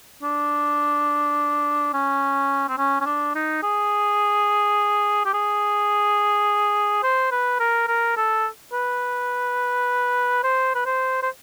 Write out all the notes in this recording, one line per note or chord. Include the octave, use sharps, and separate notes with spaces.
D4
C#4
C4
C#4
C#4
D4
D#4
G#4
G4
G#4
C5
B4
A#4
A#4
A4
B4
C5
B4
C5
C5